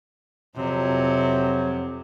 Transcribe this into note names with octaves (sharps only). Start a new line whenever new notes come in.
F2 C3 F#3